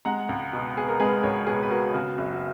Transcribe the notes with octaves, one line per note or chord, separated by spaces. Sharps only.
G#3 F#5 A#5
C#2
B2
B3 G#4
A#4
G#3 G#4 B4
C#2 A#4 C#5
B2 G#4 B4
B4
B3 F#4 A#4
C#3 F#4
F#1
F#4